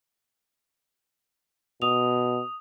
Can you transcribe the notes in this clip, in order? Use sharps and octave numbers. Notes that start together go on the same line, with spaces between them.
B2 D#6 F7